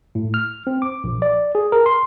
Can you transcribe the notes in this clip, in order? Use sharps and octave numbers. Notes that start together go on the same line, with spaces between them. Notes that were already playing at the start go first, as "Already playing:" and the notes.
A2
F6
C4
D6
A#1
D5
G#4
A#4
C6